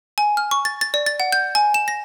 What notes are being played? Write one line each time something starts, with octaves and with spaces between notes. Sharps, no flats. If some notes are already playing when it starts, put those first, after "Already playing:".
G#5
F6
C#6
A6
A6
D5
A6
F#5
G6
G#5
E7
A#6